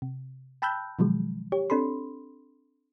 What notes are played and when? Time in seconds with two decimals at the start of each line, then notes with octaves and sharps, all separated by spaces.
0.02 C3
0.62 G5 A5 B5 E6 F#6 G6
0.99 B2 D#3 F3 F#3 G#3
1.52 G4 C#5
1.70 C4 D4 A4 B5 C6